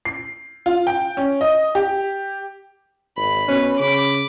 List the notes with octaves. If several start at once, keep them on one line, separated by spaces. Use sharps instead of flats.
C7
F4
G5
C#4
D#5
G4
G#1 B5
B2 C#4 B4
C#3 B5 D6